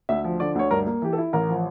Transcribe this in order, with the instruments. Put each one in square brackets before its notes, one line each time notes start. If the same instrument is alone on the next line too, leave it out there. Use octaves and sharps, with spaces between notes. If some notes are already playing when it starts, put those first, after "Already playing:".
[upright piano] D2 [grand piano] E5
[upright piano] F3
[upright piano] D3 [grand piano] D5
[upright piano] D2 [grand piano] C#5
[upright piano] G2 [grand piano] A#4
[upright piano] A#3
[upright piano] E3 [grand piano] G4
[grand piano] A4
[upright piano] E4
[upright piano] A1 [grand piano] A#4
[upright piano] F3